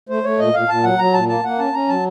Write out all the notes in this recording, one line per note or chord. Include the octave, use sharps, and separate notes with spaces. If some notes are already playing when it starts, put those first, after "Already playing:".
A3 C5
A3 C#5
A#2 D#5
A#2 F5
A#2 A5
F#3 F#5
F#3 A#5
A#2 A5
A#3 A5
A#3 F#5
C#4 A5
C#4 A#5
F#3 A5